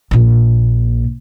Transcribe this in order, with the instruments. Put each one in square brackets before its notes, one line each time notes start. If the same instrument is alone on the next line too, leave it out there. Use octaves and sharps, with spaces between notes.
[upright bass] A#1 A#2